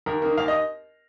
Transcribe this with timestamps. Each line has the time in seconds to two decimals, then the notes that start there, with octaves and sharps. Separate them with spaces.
0.06 D#2 A#4
0.22 D#3 A#3
0.37 D#2 F5
0.48 D#5